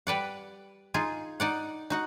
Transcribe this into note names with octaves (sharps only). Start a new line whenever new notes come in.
G3 B4 D5 F#5
D#4 F4 G#4
D#4 D5 F#5
D#4 F#4 F#5